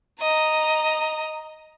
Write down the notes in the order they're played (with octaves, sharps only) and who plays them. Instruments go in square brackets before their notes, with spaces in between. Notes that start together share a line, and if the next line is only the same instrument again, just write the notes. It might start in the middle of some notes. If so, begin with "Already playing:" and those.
[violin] D#5 A#5